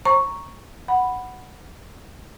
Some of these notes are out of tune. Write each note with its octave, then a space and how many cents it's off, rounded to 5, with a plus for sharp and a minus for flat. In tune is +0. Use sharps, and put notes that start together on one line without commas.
C5 +40 A#5 +0 C#6 +0
F#5 +0 B5 +0